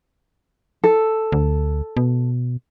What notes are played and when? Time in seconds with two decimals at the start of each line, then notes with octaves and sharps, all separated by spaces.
0.84 A4
1.32 D2
1.97 B2